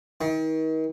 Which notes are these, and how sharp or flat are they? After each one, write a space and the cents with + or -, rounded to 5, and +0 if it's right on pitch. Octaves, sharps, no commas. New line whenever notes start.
D#3 +35